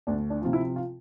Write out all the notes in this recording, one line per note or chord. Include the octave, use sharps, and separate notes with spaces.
D2 D4
D4
C3 F3 F4
E4
F4